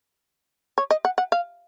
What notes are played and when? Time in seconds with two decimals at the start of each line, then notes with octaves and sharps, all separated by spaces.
0.78 C#5
0.91 D#5
1.05 F#5
1.18 F#5
1.32 F5